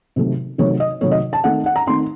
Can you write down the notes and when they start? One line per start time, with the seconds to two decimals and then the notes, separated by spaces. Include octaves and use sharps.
0.16 C3 D#3 F#3 A3
0.58 C3 D#3 F#3 A3 C#5
0.80 D#5
1.01 C3 D#3 F#3 A3 C#5
1.11 D#5
1.33 A5
1.44 D#3 A3 C4 D#4 F#5
1.66 F#5
1.76 A#5
1.87 D#3 A3 C4 D#4 C6